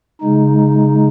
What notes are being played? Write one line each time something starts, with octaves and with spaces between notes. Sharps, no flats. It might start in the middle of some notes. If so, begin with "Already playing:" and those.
C#3 G#3 D#4